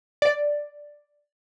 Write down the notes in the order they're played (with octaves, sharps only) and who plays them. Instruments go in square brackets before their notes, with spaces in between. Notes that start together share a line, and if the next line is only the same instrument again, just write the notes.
[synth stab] D5